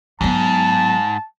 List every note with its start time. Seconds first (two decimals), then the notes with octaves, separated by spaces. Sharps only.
0.21 G#2 F#3 B3 A5